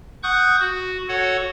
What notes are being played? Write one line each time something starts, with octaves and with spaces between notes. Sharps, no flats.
F#5 C#6 D#6 F#6 G6
F#4
F#4 A4 C#5 F#5